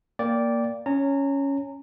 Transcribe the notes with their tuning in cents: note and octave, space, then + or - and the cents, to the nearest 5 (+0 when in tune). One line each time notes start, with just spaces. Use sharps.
A#3 +0 D5 -10 G5 +0
C#4 +0 A#5 -30